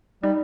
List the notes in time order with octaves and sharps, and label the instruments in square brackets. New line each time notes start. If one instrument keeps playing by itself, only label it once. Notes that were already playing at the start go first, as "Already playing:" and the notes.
[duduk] G3 [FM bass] D#4